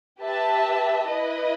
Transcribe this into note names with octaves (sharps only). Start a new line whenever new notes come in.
G4 B4 E5 A5
E4 B4 D#5